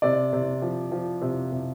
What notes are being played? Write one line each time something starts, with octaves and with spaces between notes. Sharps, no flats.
C3 D5
C3
F3
F3
C3
C3